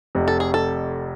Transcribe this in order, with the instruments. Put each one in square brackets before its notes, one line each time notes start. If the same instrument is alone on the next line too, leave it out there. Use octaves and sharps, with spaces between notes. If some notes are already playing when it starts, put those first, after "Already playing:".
[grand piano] F1 F2 C3
[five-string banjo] A4
G#4
A4